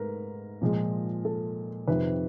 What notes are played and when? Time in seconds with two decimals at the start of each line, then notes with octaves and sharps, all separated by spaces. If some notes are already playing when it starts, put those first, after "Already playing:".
Already playing: G#2 A3 A#4 B4
0.62 A#2 F3 G#3
1.25 A4
1.87 F2 C3 D#3 B4